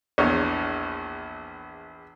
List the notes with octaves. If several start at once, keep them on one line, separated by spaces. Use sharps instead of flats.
A#1 E2 C#5